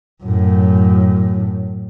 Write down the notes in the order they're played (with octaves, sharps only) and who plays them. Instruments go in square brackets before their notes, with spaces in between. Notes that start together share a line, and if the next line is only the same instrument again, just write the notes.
[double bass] F#2 A2